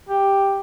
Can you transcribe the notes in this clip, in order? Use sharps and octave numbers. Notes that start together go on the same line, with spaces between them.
G4